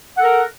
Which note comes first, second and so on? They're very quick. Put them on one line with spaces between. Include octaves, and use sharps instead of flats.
F#5 A4 A#4